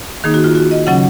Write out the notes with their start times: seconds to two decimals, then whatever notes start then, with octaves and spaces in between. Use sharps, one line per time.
0.24 D#3 A#3 D#4 G#4
0.34 F#4
0.44 F4
0.55 F#4
0.71 D#5
0.87 C#3 F#3 C#4 F#5